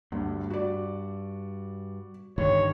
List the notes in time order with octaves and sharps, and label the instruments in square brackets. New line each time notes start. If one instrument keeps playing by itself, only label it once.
[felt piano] D2 [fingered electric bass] G2
[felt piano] F#4 D5
[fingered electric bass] G2 D3 D#3 [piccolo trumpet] C#5